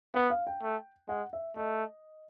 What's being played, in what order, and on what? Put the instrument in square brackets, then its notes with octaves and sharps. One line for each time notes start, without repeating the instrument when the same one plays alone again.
[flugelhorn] B3 [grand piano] F#5
[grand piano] F5
G5
[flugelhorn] A3
[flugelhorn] G#3 [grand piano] F#5
[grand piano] E5
[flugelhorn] A3 [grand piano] D#5